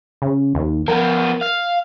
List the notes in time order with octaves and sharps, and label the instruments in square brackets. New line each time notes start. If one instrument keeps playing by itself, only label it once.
[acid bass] C#3
D#2
[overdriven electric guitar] F3 B3 [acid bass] A#4
[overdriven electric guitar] F5